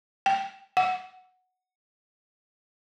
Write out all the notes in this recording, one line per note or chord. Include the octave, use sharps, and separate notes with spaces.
G5
F#5